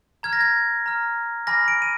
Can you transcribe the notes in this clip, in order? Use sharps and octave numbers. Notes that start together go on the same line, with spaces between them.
A#5 F6 G#6
A#6
G#6
A#5 F6
G#5 B5 D6 F6 A#6
D7
D#7